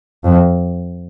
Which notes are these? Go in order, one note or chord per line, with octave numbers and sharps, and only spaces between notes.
F2